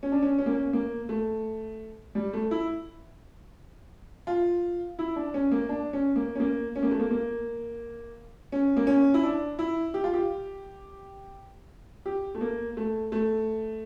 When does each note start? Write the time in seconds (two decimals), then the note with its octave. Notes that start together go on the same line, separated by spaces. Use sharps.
0.03 C#4
0.12 D4
0.22 C#4
0.38 C#4
0.46 A#3
0.53 C#4
0.73 A#3
1.09 A3
2.15 G3
2.33 A3
2.51 E4
4.27 F4
4.99 E4
5.16 D4
5.34 C#4
5.51 A#3
5.69 D4
5.93 C#4
6.16 A#3
6.35 C#4
6.40 A#3
6.76 C#4
6.83 A#3
6.91 A3
7.00 A#3
7.11 A#3
8.52 C#4
8.77 A#3
8.87 C#4
9.14 E4
9.23 D4
9.59 E4
9.94 G4
10.04 F4
10.13 G4
12.06 G4
12.35 A3
12.41 A#3
12.77 A3
13.12 A3